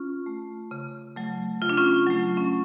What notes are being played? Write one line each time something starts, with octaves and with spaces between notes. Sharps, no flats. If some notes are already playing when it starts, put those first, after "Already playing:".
Already playing: C#4 F4
A3
C#3
F#3 A3
C#3 F4
D4
C#4 F4
F#3 A3
C#4